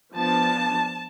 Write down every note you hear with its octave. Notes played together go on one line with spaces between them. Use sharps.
F3 B3 D4 A5